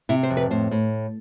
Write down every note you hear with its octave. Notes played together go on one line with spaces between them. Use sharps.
C3 E4
C5
F2
B4
A2 C5
A2